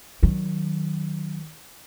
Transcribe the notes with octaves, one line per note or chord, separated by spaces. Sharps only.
D#3 F#3